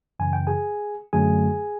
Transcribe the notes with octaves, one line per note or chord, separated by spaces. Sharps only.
F#2 C#3 E3 G#5
G5
G#4 G#5
F#2 D3 F#3 A3 G#4 G#5